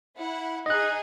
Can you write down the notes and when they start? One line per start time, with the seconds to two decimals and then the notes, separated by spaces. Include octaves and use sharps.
0.16 E4 F#5
0.66 D#4 G#4 D#5 F#6